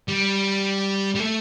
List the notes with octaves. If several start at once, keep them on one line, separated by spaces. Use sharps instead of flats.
G3
G3
A3